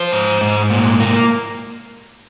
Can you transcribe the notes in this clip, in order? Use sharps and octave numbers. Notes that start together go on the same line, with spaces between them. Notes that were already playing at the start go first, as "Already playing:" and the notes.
Already playing: F3 C5
G#2
G#2
A#2
A#3